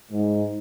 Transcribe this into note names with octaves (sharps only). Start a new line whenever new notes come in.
G#2